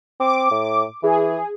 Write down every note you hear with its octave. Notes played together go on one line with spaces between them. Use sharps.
C4 D6
A2
E3 G#4